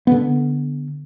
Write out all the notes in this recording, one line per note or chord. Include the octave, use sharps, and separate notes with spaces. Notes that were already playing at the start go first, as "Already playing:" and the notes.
D3 B3